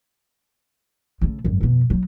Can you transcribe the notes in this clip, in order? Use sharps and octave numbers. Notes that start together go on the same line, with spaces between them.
C#3 A3
G#1 F#2
F2 B2
F#3 D#4